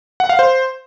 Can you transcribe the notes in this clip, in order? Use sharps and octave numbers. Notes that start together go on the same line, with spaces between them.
F#5
F5
C5